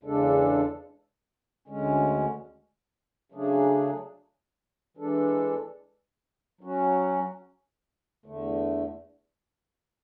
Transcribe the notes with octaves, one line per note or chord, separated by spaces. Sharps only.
E2 C#3 G#3 D4 A4
D2 D3 G#3 C#4
C#3 F#3 A3 D4 G#4
E3 G#3 D4 A4
F#3 C#4 F#4
E2 D3 A3